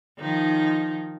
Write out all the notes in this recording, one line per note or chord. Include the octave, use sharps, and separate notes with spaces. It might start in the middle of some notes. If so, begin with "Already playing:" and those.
D#3 F3 D#4